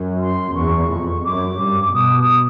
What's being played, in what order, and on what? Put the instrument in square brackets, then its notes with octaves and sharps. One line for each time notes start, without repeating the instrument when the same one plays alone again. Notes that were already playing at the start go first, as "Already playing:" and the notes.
Already playing: [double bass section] F#2
[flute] C6
[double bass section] E2 [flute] C#6
[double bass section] F2
[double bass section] F#2 [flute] D6
[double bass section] G2
[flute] D6
[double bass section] B2 [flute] D#6
[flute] D#6